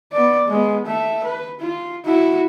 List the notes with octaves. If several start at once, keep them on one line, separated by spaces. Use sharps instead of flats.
B3 D5
G#3 B3
A3 E5
B4
F4
E4 F#4